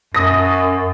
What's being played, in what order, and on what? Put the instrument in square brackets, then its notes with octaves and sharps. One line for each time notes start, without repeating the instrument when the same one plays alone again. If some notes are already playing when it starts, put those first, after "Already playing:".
[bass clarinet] F#2 [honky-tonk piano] D#6 A#6